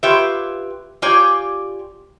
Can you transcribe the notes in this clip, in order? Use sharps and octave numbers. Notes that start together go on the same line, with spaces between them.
F4 G4 B4 C#5 E5
F4 G4 C#5 D5 G#5